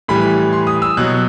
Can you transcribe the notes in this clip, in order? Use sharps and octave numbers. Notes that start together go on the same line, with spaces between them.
A2 E3 G3 B5
C6
D#6
E6
B2 F#3 F#6